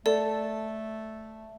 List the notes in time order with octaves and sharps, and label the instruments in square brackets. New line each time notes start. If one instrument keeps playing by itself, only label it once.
[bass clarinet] A3 [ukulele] A4 [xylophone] D5